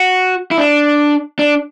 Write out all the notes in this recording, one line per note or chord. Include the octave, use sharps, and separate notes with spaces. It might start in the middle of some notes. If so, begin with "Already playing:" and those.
Already playing: F#4
E4
D4
D4